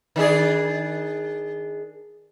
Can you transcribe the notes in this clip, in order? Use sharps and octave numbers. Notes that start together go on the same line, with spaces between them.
D#3 D4 G#4